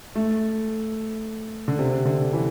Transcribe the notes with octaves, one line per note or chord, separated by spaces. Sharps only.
A3
D3
C3
D3
E3